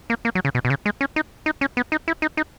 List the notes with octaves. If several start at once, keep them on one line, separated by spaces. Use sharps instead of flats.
A#3
A#3
F#3
C#3
B2
B2
C#3
G#3
C#4
D#4
D#4
C#4
B3
D#4
E4
D#4
D#4